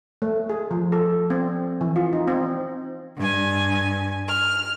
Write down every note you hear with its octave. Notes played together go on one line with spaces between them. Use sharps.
A3
G#4
F3
A4
C4
E3
F4
D#4
C4
G2 G#5
F6